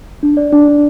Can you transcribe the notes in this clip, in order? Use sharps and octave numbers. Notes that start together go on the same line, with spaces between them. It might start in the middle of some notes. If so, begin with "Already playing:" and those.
D4
D5
D4
D4